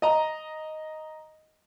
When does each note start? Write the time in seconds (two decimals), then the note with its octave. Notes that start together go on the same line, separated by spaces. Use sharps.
0.02 D#5 A#5